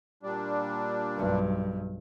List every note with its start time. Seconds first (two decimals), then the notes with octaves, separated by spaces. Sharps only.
0.23 A#2 G3 D4
1.16 B1 G2